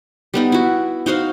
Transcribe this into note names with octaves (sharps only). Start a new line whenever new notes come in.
G3 B3 D#4
E4 F#4
D#4 F#4 C5 F5